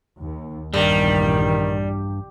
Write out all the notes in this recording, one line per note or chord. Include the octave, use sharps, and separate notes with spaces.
D#2
A#1 E2 G2 D#3 G3